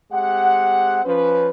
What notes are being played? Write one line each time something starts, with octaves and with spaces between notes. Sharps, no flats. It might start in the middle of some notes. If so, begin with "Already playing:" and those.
G#3 C4 G4 F#5
F3 C#4 B4